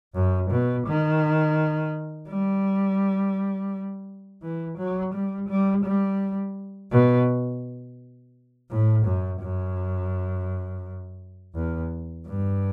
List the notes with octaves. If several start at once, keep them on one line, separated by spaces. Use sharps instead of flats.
F#2
B2
D#3
G3
E3
F#3
G3
G3
G3
B2
A2
F#2
F#2
E2
G2